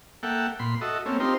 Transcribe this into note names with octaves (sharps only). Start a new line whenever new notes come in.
A#3 A4 E5 F#5 G5
A#2 B5 C6
F#4 A4 D#5 E5
A3 A#3 C4 C#4
C4 D#4 F4 G4 A#4 C5